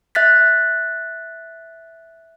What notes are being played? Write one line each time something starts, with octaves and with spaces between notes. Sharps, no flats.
E5 F#6 A6 B6